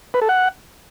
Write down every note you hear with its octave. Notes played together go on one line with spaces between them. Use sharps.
B4
A4
F#5